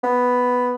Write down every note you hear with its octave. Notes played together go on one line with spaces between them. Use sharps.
B3